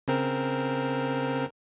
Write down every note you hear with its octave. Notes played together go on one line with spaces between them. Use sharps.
C#3 C4 A#4